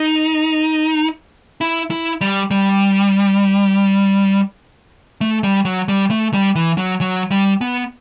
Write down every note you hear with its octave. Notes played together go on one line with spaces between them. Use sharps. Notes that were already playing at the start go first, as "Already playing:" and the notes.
Already playing: D#4
E4
E4
G3
G3
A3
G3
F#3
G3
A3
G3
E3
F#3
F#3
G3
B3